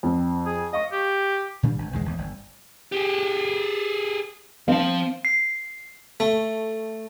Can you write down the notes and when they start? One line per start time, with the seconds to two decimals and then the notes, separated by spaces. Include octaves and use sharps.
0.03 F2
0.46 G#4
0.73 D#5 F5 C#6
0.92 G4
1.63 A#2 D#3 G3 D4
1.78 G#1
1.93 B1 E2 D#3 G#3
2.05 G#1 E2 A2
2.18 G1
2.92 G4 G#4
4.68 F3 C4 F5 A5
5.25 C7
6.20 A3